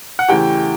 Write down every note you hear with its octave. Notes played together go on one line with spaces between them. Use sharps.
F#5
E2 C#3 E3 A3 G4 G5